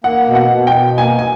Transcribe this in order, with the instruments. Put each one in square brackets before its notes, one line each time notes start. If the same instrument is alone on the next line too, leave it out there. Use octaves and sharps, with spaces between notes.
[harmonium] A#3 [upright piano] F#5
[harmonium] B2
[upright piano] F#5
[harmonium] B2
[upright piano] G5
[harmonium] B2
[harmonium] A#3 [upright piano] G#5
[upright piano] G#5